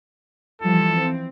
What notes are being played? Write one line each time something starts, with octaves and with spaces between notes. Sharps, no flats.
E3 F3 G3 A4
C4